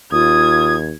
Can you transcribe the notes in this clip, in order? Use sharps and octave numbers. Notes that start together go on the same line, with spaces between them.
D#2 F4 D#6 G#6